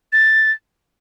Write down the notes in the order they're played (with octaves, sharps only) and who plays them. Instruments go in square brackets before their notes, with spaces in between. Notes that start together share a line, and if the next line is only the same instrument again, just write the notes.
[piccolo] A6